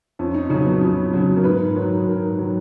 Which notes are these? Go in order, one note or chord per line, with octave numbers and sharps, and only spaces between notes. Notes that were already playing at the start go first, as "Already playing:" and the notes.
F2 C#4
D#4
C#3 F#3 C#4
B3
F2 C#4
C#3 F#3
A#4
G#2 B4
D#3 F#3
G#2 A#4
D#3 F#3